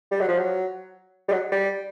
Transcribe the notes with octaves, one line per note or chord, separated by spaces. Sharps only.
G3
F#3
F3
F#3
G3
F#3
G3